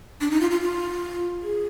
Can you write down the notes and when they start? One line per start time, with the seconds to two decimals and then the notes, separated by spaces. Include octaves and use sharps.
0.21 D4
0.31 D#4
0.41 F4
0.51 F4
0.61 F4
1.42 G#4